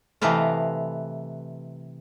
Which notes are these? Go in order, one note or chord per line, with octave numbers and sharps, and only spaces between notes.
C3 E3 A3 B4 D#5 F5